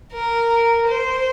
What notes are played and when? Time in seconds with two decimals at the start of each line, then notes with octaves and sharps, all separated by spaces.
0.12 A#4
0.87 C5